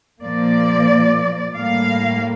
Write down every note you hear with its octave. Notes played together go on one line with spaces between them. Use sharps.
A#2 F3 A#3 D5
A2 G3 A#3 F5